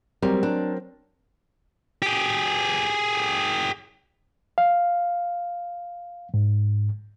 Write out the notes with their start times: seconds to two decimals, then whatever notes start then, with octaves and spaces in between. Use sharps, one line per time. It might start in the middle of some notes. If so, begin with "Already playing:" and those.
0.22 F#3 G3 C4 A#4
0.43 D4
2.02 G4 G#4
4.58 F5
6.34 G#2